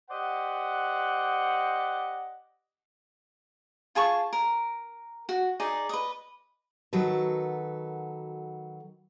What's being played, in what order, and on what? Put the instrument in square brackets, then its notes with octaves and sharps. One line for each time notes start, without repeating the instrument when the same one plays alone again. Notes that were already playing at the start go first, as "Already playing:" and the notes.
[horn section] G4 C5 D5 D#5 F#5
[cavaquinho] F4 G#4 A5 C#6
A#4
F#4
D#4 G#4 D5
B4 D#5
[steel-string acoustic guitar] D#3 F#3 F#4 A4 B4